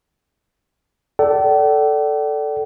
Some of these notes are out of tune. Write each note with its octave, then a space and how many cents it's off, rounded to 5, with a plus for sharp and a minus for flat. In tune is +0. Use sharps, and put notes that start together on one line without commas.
A4 +0 D5 -5 G5 -45